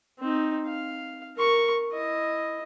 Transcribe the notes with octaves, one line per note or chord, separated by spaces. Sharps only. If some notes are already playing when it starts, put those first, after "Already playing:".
C4 D#4
F5
A#4 C#6
E4 D#5